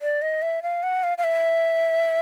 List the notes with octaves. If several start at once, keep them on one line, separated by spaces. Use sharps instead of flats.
D5
D#5
E5
F5
F#5
F5
F5
E5